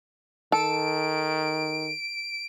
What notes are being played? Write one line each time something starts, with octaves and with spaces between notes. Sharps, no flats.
D#3 A4 D7